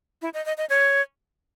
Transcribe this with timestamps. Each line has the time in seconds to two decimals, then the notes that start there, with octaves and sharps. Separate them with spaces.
0.22 E4
0.34 D#5
0.46 D#5
0.58 D#5
0.70 C#5